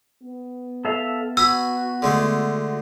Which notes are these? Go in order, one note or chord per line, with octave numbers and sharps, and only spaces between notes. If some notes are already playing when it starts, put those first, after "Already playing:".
B3
A4 E5 F5
F#4 G#5 B5 E6
D3 G#3 A3